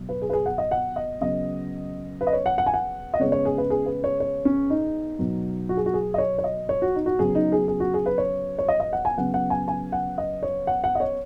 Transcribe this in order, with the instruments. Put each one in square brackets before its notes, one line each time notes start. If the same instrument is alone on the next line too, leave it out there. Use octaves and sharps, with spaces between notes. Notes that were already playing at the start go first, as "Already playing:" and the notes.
Already playing: [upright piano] B2 F#3
B4
G#4
B4
G#4
F#5
D#5
F#5
D#5
C#3 F#3 B3 D#5
B4
D#5
C#5
F#5
F#5
G#5
F#5
D#5
C#3 G#3 B3 C#5
C#5
G#4
B4
G#4
B4
C#5
C#5
C#4
D#4
B2 F#3 B3
F#4
G#4
F#4
G#4
D#5
C#5
C#5
D#5
C#5
F#4
D#4
F#4
C#3 F#3 B3 G#4
D#4
G#4
G#4
F#4
G#4
B4
C#5
C#5
D#5
D#5
F#5
G#5
C#3 F#3 B3 F#5
F#5
G#5
G#5
F#5
D#5
C#5
F#5
F#5
D#5
C#5